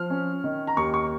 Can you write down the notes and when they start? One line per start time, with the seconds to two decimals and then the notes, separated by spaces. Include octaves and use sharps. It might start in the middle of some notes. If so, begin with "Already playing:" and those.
Already playing: F3 F6
0.10 C#4
0.44 D#3
0.67 A#5
0.77 D#2 C#6
0.94 C#6